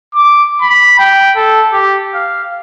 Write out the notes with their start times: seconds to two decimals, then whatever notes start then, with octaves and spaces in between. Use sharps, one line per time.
0.14 D6
0.62 B5
0.99 G5
1.36 A4
1.73 G4
2.14 F5